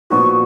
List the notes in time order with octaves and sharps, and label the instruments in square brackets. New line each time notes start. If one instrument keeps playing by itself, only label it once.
[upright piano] A#2 F3 B3 D#4 F#4 [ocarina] C#6